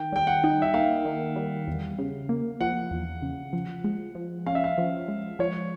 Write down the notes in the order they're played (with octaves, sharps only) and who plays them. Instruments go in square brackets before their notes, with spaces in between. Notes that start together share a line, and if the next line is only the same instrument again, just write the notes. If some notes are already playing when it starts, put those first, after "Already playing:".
Already playing: [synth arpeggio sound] D#3 [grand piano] G5
[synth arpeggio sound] G3 [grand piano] G5
[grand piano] F#5
[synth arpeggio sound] D#4
[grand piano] E5
[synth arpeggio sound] A#3 [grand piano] F5
[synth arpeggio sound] D#3
G3
E2
C#3
A#3
[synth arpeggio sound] F3 [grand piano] F#5
[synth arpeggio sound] E2
C#3
F3
G#3
F3
[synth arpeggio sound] C#4 [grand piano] F5
[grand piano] E5
F5
[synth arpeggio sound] F3
G#3
[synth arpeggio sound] F3 [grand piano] C#5